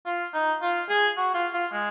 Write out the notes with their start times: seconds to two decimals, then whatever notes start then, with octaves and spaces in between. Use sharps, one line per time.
0.06 F4
0.34 D#4
0.62 F4
0.89 G#4
1.17 F#4
1.34 F4
1.53 F4
1.72 G#3